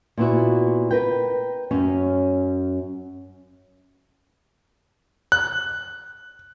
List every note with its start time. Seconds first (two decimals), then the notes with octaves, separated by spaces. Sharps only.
0.18 A#2 B3 E4 F#4
0.91 A#4 B4 G5
1.71 F#2 C#4
5.32 F#6